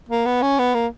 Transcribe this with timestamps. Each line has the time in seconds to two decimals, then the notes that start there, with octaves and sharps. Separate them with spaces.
0.09 A#3
0.25 B3
0.42 C#4
0.58 B3
0.74 A#3